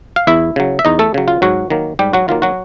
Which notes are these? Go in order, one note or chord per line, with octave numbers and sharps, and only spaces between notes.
F5
E2 E4 E5
C#3 F#3
E5
E2 D#4 D#5
A3 A4
C#3 F#3
F4
G#2 F#3 F#4
D#3 F#3 A#3
G#2 G3 G4
F#3 F#4
D#3 F#3 A#3 F4
F#3 F#4